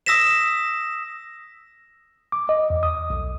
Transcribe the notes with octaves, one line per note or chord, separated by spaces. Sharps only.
D#6 E6 A#6 B6 E7
D6
D#5
E2
D#6
B1